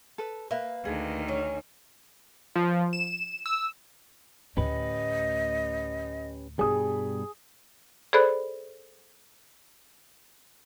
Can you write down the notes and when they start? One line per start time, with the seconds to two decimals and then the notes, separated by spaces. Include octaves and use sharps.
0.18 A4 B4
0.51 A#3 B4 E5
0.85 D2 D#3 G#4
1.28 C#4
2.55 F3
2.93 E7
3.46 E6
4.57 D2 A2 C#4 G4 B4 D#5
6.59 G2 B2 G3 G#4 D#6
8.13 G#4 A4 C5 D5 B5 F#6